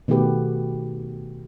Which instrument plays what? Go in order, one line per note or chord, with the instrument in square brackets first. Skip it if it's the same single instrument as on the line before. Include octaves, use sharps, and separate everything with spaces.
[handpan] B2 D#3 A3 F#4 G4 B4